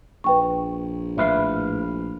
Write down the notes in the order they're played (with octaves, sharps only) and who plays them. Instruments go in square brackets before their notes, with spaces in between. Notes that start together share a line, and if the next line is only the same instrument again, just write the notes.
[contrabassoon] A#1 [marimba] B4 G5 C#6
[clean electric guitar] A2 B4 F5 [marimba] E5